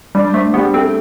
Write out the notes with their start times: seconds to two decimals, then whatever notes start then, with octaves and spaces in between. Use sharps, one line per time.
0.15 G3 D4
0.34 A3 C5
0.54 G3 B3
0.74 A3 C4